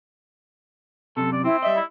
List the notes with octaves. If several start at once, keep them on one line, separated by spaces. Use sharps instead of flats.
F#2 C3 A4
D5
C4 E4
G3 D#5 E5
E4